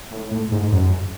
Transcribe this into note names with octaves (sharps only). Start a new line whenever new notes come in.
A2
A2
G#2
F#2